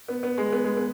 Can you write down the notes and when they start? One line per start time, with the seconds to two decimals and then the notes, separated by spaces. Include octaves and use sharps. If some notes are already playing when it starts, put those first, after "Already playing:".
0.08 B3
0.23 B3
0.38 G#3
0.53 B3
0.65 G#3
0.77 B3